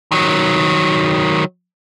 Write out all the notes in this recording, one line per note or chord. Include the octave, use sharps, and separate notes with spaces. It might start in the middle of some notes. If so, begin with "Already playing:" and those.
D#3 F#3